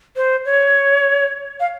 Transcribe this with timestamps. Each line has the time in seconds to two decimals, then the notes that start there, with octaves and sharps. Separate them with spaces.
0.16 C5
0.45 C#5
1.60 F5